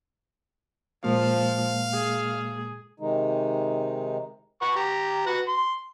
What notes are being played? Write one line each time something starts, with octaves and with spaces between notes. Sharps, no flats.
A#2 F3 G#3 A#3 F5
G#4
C3 D#3 G#3 D#4
B4 F#5 C#6
G4 A#5
F#4 B4 F#5
C6